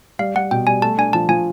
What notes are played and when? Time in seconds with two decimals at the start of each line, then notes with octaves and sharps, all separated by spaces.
0.19 G3 F5
0.35 G3 F#5
0.51 B2 G5
0.67 G3 G#5
0.82 A3 A5
0.98 D4 G#5
1.13 F3 A5
1.29 F3 G#5